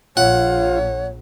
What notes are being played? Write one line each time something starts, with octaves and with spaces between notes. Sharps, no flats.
A#1 F4 C#5 F#5